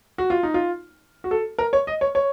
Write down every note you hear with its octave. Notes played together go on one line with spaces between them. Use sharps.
F#4
F4
D#4
F4
F#4
A4
A#4
C#5
D#5
C#5
C#5